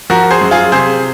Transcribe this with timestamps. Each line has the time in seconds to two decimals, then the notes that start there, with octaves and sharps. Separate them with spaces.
0.10 F3 F#4 A#4
0.31 G#4 C5
0.41 F#2
0.51 F4 G#4
0.72 C3 G#4 C5